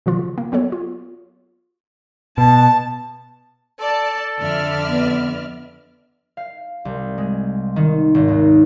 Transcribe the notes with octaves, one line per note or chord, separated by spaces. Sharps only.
B2 D3 D#3 F3 F4
C#3
A#3
F#3 B3 A4 C#5
F4
B2 A5
A4 D5 A5
F2 D3 D5 E5 F6
B3
F5
C2
G#3
D#3
G#1
D#2